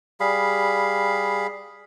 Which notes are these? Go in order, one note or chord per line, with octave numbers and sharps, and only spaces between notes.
G3 G#4 F5 B5